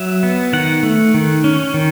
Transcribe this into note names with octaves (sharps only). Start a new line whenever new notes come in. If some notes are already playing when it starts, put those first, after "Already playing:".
Already playing: F#3 E5
B3
D#3 F#5
A3
D#3
C#4
D#3